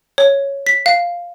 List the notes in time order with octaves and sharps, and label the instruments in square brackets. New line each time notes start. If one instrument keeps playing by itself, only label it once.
[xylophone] C#5
B6
F5